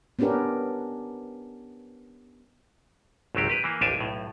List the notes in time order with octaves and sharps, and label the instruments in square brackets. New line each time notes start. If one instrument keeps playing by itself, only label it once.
[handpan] B3 C#4 D4 G4 A#4 B4
[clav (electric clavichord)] G#1 C#2 F#3 C4 G4
G4 B4
E3 A#3
A1 D#2 D4 G4 G#5 A5
B1 A2